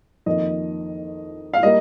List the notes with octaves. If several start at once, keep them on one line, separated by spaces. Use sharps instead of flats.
F2 D#3 A#3 D#5
F5
G3 A#3 D#5